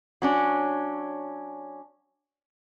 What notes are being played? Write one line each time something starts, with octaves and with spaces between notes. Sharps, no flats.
F#3 C#4 D4